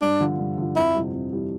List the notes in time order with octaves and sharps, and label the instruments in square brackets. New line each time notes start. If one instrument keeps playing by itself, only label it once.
[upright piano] G2 [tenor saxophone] D4
[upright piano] D3 F3
G2
D3 F3
[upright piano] F2 [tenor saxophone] E4
[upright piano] C3 E3 G3
F2
C3 E3 G3